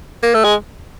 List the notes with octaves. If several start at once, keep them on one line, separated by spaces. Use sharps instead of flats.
A#3
A3
G#3